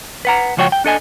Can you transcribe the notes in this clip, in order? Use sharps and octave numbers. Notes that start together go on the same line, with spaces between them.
B4 F#5 A#5
C#2 F3 F#4 C#5 D#5 G5
G5
D4 A4 D#5 G#5